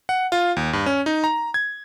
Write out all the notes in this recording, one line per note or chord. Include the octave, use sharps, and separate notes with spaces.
F#5
F4
D#2
G2
C#4
D#4
A#5
G#6